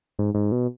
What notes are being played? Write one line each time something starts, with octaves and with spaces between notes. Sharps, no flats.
G#2
G#2
B2